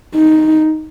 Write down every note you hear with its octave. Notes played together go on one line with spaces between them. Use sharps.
D#4